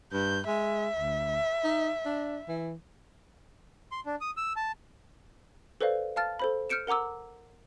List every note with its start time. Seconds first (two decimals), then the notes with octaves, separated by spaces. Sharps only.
0.13 G2 G6
0.47 G#3 E5
0.95 D2
1.64 D#4
2.05 D4
2.48 E3
3.91 C6
4.06 D4
4.21 D#6
4.37 E6
4.56 A5
5.81 A4 B4 C5 D5 F5
6.16 F5 A5 F6 A6
6.40 A4 C5 B5
6.70 F6 G6 C#7 D7 E7
6.87 A#4 F#5 A#5 D6 E6